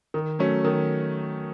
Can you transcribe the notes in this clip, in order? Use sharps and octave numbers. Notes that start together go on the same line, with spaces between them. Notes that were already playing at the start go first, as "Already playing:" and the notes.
D#3
F#3 A3 C#4
D#3